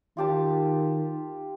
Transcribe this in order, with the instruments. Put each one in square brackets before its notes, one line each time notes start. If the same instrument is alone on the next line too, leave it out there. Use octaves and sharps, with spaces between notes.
[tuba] D#3 [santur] F4 G4 A5